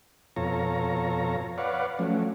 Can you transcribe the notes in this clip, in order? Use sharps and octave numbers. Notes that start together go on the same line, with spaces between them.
F2 B2 F4 A4 C#5 A#5
B4 C#5 D5 F5 F#5
F3 F#3 A3 C#4